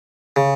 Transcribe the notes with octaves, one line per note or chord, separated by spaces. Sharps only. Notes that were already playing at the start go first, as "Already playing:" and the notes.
C#3